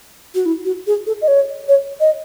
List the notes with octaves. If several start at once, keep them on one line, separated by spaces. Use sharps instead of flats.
F#4
E4
F#4
G#4
A4
D#5
C#5
C#5
D#5